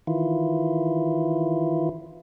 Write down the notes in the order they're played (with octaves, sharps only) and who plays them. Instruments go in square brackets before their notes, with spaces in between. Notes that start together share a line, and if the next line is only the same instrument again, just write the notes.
[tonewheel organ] D#3 E3 E4 F4